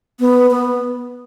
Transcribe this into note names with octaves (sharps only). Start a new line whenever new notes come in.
B3
B3